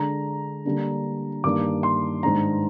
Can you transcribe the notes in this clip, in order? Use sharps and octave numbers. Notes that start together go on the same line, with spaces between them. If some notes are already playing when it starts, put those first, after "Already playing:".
Already playing: D3 G#3 D4 A#5
D3 G3 A#3 D4
G2 D#3 A#3 D4 D6
C6
G#2 D#3 G#3 D4 A#5